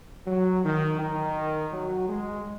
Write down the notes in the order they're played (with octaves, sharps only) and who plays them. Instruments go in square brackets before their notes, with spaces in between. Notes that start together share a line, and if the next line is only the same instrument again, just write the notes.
[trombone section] F#3
D#3
D#3
F#3
G#3